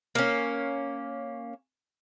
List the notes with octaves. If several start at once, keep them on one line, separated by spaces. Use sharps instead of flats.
A#3 C#4